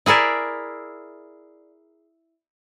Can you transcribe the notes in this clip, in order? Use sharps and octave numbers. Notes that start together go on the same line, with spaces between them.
E4 G#4 A#4 D5 E5